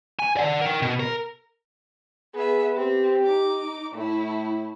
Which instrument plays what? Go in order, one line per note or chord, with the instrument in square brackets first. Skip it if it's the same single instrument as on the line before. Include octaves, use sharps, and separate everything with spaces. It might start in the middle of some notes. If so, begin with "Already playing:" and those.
[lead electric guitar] G#5
D5 F#5
A#4 G5
B2
A#4
[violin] B3 E5 [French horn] G#4
[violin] C4 [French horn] G4
[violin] D#4 D6
[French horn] A2 [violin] A3 E4